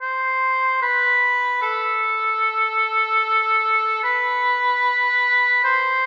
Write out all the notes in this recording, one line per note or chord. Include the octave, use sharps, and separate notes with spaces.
C5
B4
A4
B4
C5